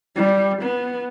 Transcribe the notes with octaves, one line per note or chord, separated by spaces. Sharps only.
G3
B3